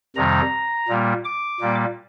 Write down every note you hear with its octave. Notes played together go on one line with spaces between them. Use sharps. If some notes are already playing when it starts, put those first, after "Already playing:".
F2 C3 D#3 G3 A#5
A#2 G3 A#3
D6
A#2 G3 A#3